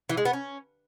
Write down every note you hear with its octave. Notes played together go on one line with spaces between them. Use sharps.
E3
G#3
B3
C#4